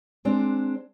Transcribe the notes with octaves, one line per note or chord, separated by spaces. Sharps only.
G#3 C4 D4